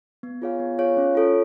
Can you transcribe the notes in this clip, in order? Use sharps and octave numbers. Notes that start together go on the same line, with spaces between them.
B3
F4 G#4 C#5 F5
B3
F4 G#4 C#5 F5
C#4
F4 A4 C#5